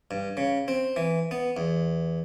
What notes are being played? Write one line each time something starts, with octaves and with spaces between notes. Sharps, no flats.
G2
C#3
C4
E3
B3
E2